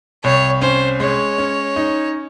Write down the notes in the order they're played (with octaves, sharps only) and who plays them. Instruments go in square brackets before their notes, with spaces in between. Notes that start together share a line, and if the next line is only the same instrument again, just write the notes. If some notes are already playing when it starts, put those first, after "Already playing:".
[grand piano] C2 [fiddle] C#5
[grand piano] C#4 [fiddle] C5
[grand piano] G#3 [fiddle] C#5
[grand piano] C#4
D#4